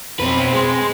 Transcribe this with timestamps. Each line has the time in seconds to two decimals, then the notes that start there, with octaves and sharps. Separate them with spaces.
0.19 B1 F2 C4 B4
0.53 G#3 B5 C6